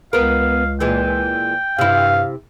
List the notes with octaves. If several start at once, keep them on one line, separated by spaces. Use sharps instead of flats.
C#2 B3 A#4 F5
A#2 E3 G#3 G5
G2 C3 E4 F5